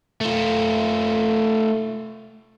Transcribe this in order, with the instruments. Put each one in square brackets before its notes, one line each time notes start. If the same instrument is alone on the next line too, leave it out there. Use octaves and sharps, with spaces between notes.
[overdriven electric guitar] A3 F4